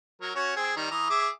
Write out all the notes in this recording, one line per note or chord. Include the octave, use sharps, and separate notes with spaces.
F#3 A#4
C#4 F#4 C#5
C4 G#4 G#5
D#3 G3 A#5
E3 A#5 D#6
G#4 E5 D6